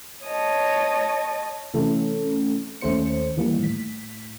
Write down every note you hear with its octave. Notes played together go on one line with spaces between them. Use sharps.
C#5 D#5 A5
C3 E3 A3 C#4 A4
D#2 A3 C#4 C5 C#7
D#3 E3 G3 A#3
A2 B6